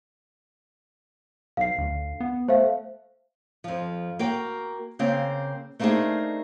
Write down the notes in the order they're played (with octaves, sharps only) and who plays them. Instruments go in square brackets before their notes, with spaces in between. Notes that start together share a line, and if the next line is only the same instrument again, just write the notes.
[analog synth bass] B1 [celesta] F5 C7
[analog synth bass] D2
B3
[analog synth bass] A3 [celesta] C5 E5 F5
[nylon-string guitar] F2 F3
A#3 F#4 G5
C#3 A#3 C4
A3 A#3 C4 D4 D#4 G#4